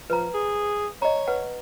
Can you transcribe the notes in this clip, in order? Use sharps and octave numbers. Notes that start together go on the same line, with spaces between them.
F3 B4 A#5
G#4
C#5 D#5 A#5
B4 F#5